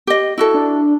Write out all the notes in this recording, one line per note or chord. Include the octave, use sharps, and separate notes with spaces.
G4 D#5
E4 F#4 A4
D4